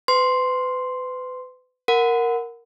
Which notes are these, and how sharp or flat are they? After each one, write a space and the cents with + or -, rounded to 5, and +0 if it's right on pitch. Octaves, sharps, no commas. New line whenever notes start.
B4 +35 C6 +0
A#4 +0 F#5 -10 B5 +45